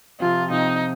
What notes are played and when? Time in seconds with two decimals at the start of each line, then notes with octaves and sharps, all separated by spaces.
0.20 C3 F3 C4 F4
0.51 C3 F3 C4 D#4